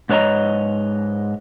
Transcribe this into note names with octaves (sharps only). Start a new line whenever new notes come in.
G#2 B4 C#5 D#5 A#5